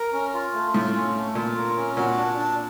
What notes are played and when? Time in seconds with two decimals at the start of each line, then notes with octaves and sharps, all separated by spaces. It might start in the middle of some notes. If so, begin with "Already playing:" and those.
Already playing: A#4
0.13 C#4
0.34 F4
0.54 A3
0.74 A2 F4
0.94 C#4
1.15 A3
1.35 A#2 F4
1.56 A#4
1.77 C#4
1.96 A#2 F#4
2.17 D4
2.37 D4